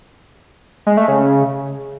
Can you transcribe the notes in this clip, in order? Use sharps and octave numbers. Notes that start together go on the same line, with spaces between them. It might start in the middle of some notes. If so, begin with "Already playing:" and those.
G#3
A3
C#3